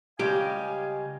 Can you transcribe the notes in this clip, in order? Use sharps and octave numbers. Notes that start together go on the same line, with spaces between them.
C#2 G3 G4 D#5 F5 G#5